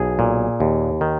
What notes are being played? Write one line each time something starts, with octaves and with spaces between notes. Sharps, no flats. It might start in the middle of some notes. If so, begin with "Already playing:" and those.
Already playing: B1 G#4
A#2
D#2
D#3